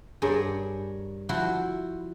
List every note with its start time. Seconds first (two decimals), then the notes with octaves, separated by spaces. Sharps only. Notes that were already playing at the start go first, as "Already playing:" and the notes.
0.22 G2 G#4 A#4 C#5
1.29 F3 E4 F#4